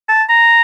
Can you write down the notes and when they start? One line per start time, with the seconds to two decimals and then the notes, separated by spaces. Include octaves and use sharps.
0.09 A5
0.29 A#5